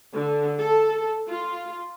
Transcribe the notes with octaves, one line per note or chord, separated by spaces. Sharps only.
D3
A4
F4